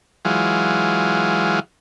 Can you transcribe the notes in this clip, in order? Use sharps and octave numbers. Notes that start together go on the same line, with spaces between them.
E3 F#3 G#3 F4